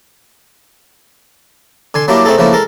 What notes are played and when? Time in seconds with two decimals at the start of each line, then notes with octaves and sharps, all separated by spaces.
1.94 D3 G#5 C6
2.08 F#3 G3 A#3 D4 E4 G4
2.25 A3 C4 D#4 G#4 A4
2.38 C#3 F3 A3 A#3 E4
2.53 G#3 A4 A#4